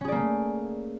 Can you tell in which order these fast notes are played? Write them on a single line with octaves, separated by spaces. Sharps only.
C#4 G#4 D5 A#3 A3